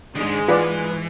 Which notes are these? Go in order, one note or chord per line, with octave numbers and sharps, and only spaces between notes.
G#2 D#3 G#3 D4
E3 F4 B4 D5 F#5